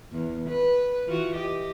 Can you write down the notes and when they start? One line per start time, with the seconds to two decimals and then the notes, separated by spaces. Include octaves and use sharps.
0.12 E2
0.49 B4
1.06 E3 F4 F#4
1.35 G4 D#5